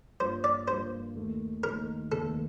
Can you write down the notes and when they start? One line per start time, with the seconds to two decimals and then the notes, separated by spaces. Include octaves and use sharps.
0.20 G2 F3 A#3 F4 C5
0.44 D5
0.68 G2 F3 A#3 F4 C5
1.16 D#2 D#3 A3
1.63 D#2 D#3 A3 A#4
2.12 F1 D#2 D#3 A#3 A4